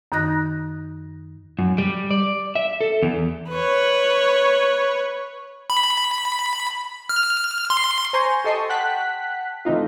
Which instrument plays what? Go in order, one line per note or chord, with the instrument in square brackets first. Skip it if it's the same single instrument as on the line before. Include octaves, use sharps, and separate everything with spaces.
[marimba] F#2 D#3 D#4 F#6 A#6
[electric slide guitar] F#2
G3
D5
E5
A4
E2
[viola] B4 C#5
[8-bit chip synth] B5
F6
C6
[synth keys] C5 G#5 A#5 C6 C#6 G6
G4 A4 D#5 C6 C#6 D#6
F#5 G5 A5 F#6 B6
E3 A3 C4 D#4 F4